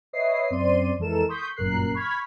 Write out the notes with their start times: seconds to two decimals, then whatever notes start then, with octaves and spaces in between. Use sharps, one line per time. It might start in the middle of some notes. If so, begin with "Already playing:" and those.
0.13 B4 C#5 D#5 E5 D#6 C7
0.50 F#2 C4 D5 C6 D#7
0.99 F2 E3 G#3 A4 A#4 E7
1.29 C6 C#6 D#6 G6 B6
1.56 G1 F#2 A#2 A#4 F#6 C7
1.94 B5 C#6 F6 G#6 B6